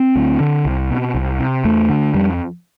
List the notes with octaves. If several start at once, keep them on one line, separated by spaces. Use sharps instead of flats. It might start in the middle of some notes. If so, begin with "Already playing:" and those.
Already playing: C4
D2
D3
C2
B2
C2
C3
E2 A3
D3
F2 G3